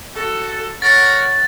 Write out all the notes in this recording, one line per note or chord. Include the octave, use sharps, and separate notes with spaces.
F#4 A4
A#4 C#5 F#5 A6